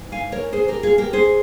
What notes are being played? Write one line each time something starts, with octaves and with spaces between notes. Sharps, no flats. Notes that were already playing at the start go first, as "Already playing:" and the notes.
Already playing: G#2 E3
F5 G#5
A#4 C#5
G#4 C5
G4 A#4
F4 G#4
G4 A#4
G#4 C5